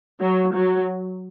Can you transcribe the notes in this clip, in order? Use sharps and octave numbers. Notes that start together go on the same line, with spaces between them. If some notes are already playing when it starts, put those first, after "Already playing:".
F#3
F#3